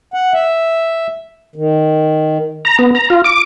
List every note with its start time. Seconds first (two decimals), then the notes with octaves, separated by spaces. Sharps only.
0.14 F#5
0.34 E5
1.56 D#3
2.65 A#5
2.79 B3
2.95 A#5
3.10 F4
3.24 D6